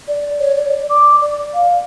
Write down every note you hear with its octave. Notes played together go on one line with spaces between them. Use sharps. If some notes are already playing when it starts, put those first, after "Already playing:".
D5
C#5
D5
D5
D6
D5
F5